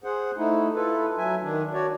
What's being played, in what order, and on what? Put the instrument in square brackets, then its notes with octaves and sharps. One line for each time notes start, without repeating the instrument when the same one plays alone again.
[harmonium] G#4 C5 F#5
A3 D#4 E4
E4 F4 A4 B4
F#3 E5 G#5
D#3 D4
F#4 C#5 D5